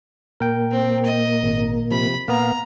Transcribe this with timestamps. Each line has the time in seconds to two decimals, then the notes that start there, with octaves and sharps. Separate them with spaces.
0.40 A#2 A#3 A#4 G5
0.71 C4
1.05 D#5
1.43 G#1
1.91 C3 F3 B5
2.28 A#2 A#3 B3 F5 A#5